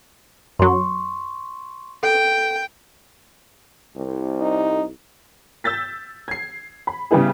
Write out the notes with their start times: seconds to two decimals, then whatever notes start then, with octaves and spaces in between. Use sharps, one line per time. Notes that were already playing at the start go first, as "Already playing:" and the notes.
0.59 F#2 F#3 C6 C#6
2.03 A4 G5
3.96 C2
4.41 D#4
5.64 E6 G6 A6 B6
6.28 G#6 C7
6.87 B5
7.11 C#3 G3 B3 E4 G#4